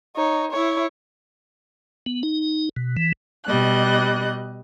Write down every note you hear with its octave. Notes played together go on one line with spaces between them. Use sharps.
D#4 C#5
E4 C#5
B3
D#4
B2
E3
B2 G3 D#5 F#6